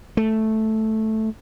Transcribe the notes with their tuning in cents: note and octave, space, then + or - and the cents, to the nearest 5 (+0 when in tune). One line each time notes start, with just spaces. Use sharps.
A3 -5